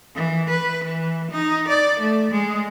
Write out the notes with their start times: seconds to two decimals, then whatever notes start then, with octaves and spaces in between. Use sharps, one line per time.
0.15 E3
0.50 B4
0.84 E3
1.31 D#4
1.68 D5
2.00 A3
2.31 G#3